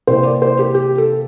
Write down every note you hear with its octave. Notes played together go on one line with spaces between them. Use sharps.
C3 E3 A#3 C5
D5
C5
G4
G4
A4